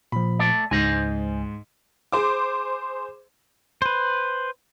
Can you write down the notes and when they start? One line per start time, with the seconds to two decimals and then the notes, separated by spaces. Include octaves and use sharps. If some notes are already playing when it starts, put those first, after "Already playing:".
0.12 A#2 F3 B5
0.39 A3 D5
0.71 C#2 G#2 C5 D#5 G#5
2.12 G#4 C5 D6
3.82 B4 C5